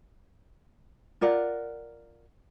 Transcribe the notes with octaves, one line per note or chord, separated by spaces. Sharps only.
F4 A#4 D5 F#5